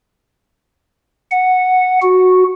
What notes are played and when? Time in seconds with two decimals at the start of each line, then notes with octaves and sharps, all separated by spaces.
1.31 F#5
2.02 F#4